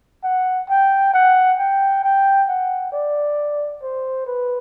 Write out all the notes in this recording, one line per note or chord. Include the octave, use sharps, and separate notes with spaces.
F#5
G5
F#5
G5
G5
F#5
D5
C5
B4